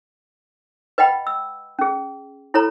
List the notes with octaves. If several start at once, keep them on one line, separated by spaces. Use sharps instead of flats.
B4 D#5 F#5 G5 B5
E6
C#4 G#4
E4 A4 C#5 A#5 B5